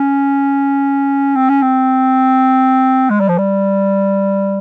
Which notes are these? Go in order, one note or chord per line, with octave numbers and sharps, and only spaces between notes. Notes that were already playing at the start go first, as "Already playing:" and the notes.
Already playing: C#4
C4
C#4
C4
G#3
G3
F3
G3